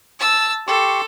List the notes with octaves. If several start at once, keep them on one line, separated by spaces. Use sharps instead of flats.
A5 E6
G4 A4 C6 C#6